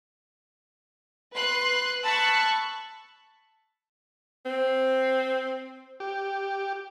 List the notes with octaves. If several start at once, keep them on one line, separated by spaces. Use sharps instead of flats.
B4 C6 F#6
A5 B5 C#6 E6 F#6
C4
G4